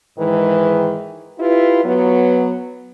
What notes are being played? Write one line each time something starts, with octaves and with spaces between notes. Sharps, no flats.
G#2 D#3 E3 G#3
E4 F4 G4 B4
F#3 B3